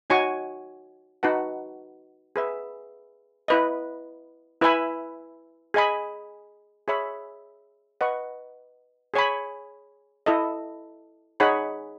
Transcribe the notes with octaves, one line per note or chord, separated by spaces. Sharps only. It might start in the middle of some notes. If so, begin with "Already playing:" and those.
D#4 F#4 C#5 G#5 C#6
D#4 F#4 B4 F#5 A5
G#4 B4 E5
E4 B4 D#5
E4 B4 E5 G#5 B5
G#4 D#5 G#5 B5
G#4 C#5 E5 B5
B4 D#5 F#5 C#6
G#4 C#5 G#5 B5
E4 A4 D#5
D#4 G#4 C#5 F#5 B5